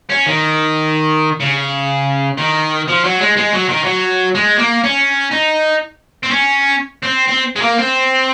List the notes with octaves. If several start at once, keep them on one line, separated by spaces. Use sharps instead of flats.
C#4
D#3
C#3
D#3
F3
F#3
G#3
G#3
F#3
D#3
F#3
G#3
A#3
C#4
D#4
C4
C#4
C4
C4
G#3
A#3
C4